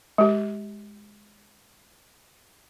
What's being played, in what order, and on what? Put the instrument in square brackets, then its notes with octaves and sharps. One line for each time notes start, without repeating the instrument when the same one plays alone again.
[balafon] G#3 G4